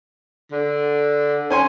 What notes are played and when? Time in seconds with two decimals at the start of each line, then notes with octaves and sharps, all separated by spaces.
0.52 D3
1.50 C#4 G#5 C6